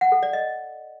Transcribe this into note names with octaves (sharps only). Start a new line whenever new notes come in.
F#5
A4
D5
D#5